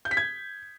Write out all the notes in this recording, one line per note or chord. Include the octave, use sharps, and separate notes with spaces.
G6
B6
G#6